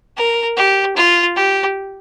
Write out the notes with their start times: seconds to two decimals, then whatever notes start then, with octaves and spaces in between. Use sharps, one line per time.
0.17 A#4
0.57 G4
0.96 F4
1.36 G4